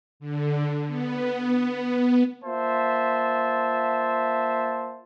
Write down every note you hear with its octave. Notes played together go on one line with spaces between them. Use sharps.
D3
B3
A#3 F4 C5 E5 A5